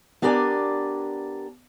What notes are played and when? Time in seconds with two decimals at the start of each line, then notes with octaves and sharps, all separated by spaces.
0.22 B3 D4 G4 A#4 D5 G#5